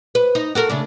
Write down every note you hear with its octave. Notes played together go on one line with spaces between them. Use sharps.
B4
D#4
F#4 A4 A#4
C#3 A3 D4